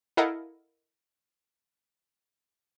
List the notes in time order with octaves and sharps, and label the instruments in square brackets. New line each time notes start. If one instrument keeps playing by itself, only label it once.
[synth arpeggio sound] E4 A4 A#4 D#5 F5 F#5